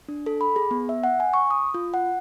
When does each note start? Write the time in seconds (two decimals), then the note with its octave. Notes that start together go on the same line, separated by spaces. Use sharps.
0.08 D4
0.26 A4
0.41 B5
0.56 G#4
0.71 B3
0.89 E5
1.04 F#5
1.20 G#5
1.34 C#6
1.51 D#6
1.74 F4
1.94 F#5